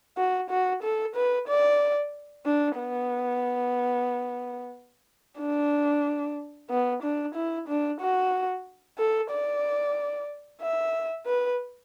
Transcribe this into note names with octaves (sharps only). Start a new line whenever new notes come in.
F#4
F#4
A4
B4
D5
D4
B3
D4
B3
D4
E4
D4
F#4
A4
D5
E5
B4